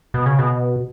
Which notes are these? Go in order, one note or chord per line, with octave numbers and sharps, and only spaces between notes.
B2
C#3
B2